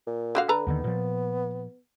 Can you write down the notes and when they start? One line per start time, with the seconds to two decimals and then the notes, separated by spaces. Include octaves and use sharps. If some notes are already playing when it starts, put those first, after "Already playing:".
0.07 A#2
0.35 D3 F#4 F5
0.49 D3 A4 B4 A#5
0.67 D#2 D3 D#3 B3
0.84 A#2 F3